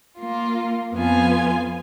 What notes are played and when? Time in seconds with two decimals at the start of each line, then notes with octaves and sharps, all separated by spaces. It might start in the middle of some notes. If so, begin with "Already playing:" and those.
0.19 A#3 F4
0.94 F2 B3 F4 G#5